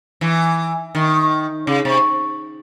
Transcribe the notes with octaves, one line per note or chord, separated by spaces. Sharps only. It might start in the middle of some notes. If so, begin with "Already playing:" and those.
E3
D#3
C#3
C3